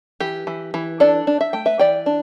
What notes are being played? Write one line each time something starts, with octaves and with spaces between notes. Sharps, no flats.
E3 G4
E3
E3
D4 A4 D5
D4
E5
A3 G5
B4 E5
E3 D5 G5
D4